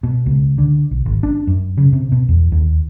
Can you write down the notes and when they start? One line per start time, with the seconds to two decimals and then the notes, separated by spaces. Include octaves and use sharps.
0.03 B2
0.26 C#2
0.58 D3
0.91 B1
1.06 G#1
1.23 D4
1.47 F#2
1.77 C#3
1.93 C3
2.12 B2
2.29 E2
2.52 D#2